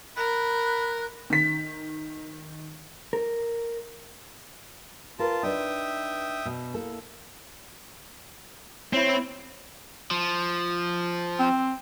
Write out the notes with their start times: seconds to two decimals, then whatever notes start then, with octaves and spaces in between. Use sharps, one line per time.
0.17 A#4 B5 F#6
1.30 D#3 B6
3.13 A#4
5.19 F4 A#4 B4 A5
5.43 D4 D#4 B4 E5 G5 D#6
6.45 B2
6.74 A#3 E4 A4
8.93 C4 E4 C#5
10.11 F3
11.39 C4